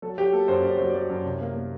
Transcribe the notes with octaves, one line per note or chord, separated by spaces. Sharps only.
F#3 A4
F#3 G4
A#3 A4
F#2 C5
F#2 D5
F#3 C5
F#3 D5
F#2
C2
A#3
A#3